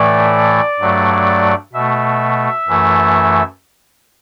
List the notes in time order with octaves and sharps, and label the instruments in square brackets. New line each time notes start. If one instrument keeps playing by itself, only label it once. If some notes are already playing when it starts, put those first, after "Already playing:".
Already playing: [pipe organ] A2 E3 A3 D5
G2 F#3 A3
B2 A3 E5
F#2 E3 A3